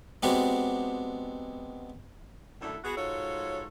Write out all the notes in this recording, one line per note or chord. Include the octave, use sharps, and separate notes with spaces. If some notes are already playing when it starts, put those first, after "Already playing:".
G#3 B3 C4 D4 F#4 G4
F#2 A2 D3 D4 E4 A4
B3 F#4 G#4
G#2 F4 F#4 A4 C#5